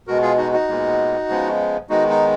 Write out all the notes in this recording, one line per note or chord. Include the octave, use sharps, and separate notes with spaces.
B2 G#3 B3 F#4 A#4
F4 G#4
D#4 F#4
D#4 F#4
A#2 G#3 B3
C#3 F3 G#3 B3
D#3 G#3 B3 D#4 F#4
D#4